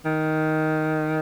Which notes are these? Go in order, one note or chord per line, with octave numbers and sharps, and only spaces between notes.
D#3